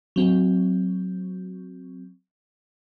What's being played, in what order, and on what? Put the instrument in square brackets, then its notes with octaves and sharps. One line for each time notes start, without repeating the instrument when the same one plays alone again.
[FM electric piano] F#3 C4